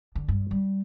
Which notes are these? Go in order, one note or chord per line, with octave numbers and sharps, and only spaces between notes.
D3
G2
G3